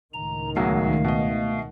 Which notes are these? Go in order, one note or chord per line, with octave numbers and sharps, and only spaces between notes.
C#2 A2 D#3 A#5
B1 F#3 G#3 A3 F5
B2 D#5